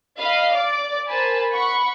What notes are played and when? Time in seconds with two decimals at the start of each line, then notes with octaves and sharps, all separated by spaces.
0.19 D#5 F5 B5
0.54 D5 D6
1.08 A#4 C5 G#5 A5 B5
1.53 F#5 B5 C#6